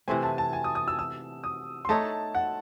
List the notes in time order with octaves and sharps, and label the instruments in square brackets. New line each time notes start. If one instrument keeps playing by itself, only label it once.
[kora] C3 E3 A3 C4 [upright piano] G#5
[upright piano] A5
A5
G#5
D#6
D#6
E6
E6
D#6
C6
[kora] A3 D#4 A4 C#5 [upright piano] A5
[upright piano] F#5